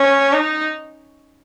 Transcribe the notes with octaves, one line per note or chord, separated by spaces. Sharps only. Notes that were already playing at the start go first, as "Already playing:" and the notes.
Already playing: C#4
D#4